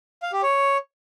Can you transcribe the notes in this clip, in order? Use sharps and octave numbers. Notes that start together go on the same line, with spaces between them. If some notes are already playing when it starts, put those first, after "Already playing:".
F5
G4
C#5